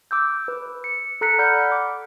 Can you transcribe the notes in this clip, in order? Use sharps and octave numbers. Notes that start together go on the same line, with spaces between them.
D6 E6 G6
B4
C#7
A4 A#5 F#6 B6 C#7
D5 F#5 B5 F6 G6
D6